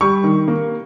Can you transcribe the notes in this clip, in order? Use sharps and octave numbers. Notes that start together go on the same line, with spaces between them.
G3 C#6
D#3
A#3